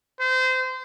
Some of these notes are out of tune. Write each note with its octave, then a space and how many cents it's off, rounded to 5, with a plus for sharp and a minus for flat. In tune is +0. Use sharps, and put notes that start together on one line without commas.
C5 -25